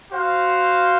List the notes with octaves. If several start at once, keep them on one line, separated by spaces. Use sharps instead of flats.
F#4 C5 F5